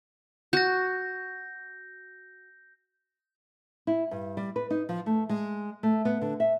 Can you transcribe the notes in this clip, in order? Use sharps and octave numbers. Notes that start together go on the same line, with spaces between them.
F#4 G6 A#6
E4
G2
G3
B4
D#4
F3
A3
G#3
A3
B3
D3
E5